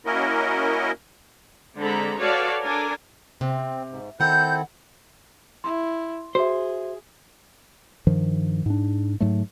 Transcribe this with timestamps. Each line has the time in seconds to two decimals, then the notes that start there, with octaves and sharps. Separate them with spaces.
0.06 A#3 C#4 E4 F#4 A#4 D#5
1.78 D3 G#3 C4 A4 A#5 B5
2.19 F#4 A4 B4 C#5 D5 F5
2.63 D4 A4 A#4 G#5
3.41 C3 C4
3.92 G#2
4.20 D#3 C4 E4 A4 F#5 G6
5.64 E4 C6
6.35 F#4 G#4 C5 E5
8.07 G2 D#3 F3
8.66 G#2 D4
9.20 G#2 F#3 A3